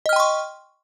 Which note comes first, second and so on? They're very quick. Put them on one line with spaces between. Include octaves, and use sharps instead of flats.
D#5 F6 G5 C6 C#6